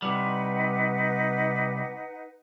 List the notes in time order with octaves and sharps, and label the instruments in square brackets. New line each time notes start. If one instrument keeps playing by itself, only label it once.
[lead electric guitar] C3 G3 [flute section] D#4 B4 F#5